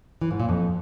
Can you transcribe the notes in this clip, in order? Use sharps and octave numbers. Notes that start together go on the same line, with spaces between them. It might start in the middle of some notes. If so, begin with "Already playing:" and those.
E3
G#2
A#2
F2